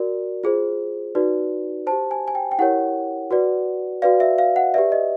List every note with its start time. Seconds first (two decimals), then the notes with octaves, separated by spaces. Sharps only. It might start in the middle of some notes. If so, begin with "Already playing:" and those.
Already playing: F#4 A#4 D5
0.44 F4 G#4 C5
1.15 D#4 F#4 B4 D5
1.87 G4 C5 A5
2.11 G#5
2.28 G#5
2.35 G5
2.52 G5
2.59 E4 G4 A#4 C#5 F#5
3.31 F#4 B4 D5
4.02 F#4 B4 D5 F5
4.20 E5
4.38 F5
4.56 F#5
4.74 G4 B4 D5 E5
4.92 D#5